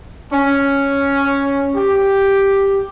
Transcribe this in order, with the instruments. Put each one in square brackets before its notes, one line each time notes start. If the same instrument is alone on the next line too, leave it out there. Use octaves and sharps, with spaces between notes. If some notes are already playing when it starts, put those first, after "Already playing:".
[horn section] C#4
G4